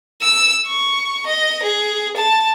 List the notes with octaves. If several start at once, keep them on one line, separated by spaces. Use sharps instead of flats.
E6
C#6
D#5
G#4
A5